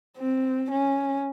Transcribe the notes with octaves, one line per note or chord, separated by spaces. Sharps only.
C4
C#4